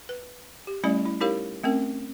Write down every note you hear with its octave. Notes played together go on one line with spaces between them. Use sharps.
B4
G4
G3 A3 C#4 E4 D5 B5
E4
D#4 E4 G4 A#4 C#5 F5
A3 C4 C#4 A#4